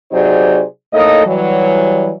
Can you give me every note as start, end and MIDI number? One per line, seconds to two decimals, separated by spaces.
0.11 0.62 48
0.11 0.62 54
0.11 0.62 63
0.11 0.62 68
0.11 0.62 72
0.11 0.62 74
0.93 1.26 45
0.93 1.26 58
0.93 1.26 63
0.93 1.26 69
0.93 1.26 75
1.26 2.11 52
1.26 2.11 54
1.26 2.11 55